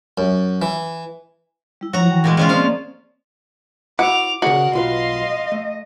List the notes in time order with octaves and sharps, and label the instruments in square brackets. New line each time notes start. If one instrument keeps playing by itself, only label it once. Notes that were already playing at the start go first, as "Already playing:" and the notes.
[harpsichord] F#2
E3
[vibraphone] G3 E4
[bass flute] F3 [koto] F#4 A#5 [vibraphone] C#5
[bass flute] E3 [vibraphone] G5
[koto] A#2 G3 G#3
G#3 C#4 F4
[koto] F3 F5 [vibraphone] A#3 C4 D5
[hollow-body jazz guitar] E4 F#4 [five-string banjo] F#5 [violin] D6 F7
[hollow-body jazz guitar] C#3 G#4 D5 [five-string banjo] F#4 [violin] A#4 F#5
[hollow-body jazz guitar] B1 F4 B4 [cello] D#5 [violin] F5 C6
[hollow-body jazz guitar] A3